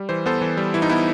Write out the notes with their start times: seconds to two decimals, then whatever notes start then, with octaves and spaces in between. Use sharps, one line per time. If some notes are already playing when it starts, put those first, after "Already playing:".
Already playing: G3
0.09 E3 C5
0.26 B3 A4 C5
0.41 E3
0.57 G3
0.74 E3 E4
0.82 D#4
0.90 B3 E4